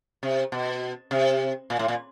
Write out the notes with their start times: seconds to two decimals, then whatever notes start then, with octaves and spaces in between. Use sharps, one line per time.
0.23 C3
0.52 B2
1.11 C3
1.70 A#2
1.79 A2
1.88 A#2